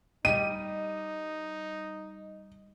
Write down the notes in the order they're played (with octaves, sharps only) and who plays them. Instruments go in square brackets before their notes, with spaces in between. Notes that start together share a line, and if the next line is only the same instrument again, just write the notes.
[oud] G3 G4 [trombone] D#4 [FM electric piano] D#5 [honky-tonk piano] D#7